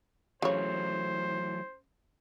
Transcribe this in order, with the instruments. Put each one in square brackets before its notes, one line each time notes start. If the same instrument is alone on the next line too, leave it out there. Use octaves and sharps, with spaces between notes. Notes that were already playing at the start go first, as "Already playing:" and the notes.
[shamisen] C#3 C#5 [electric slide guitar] E3 F#3 A3 [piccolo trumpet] C5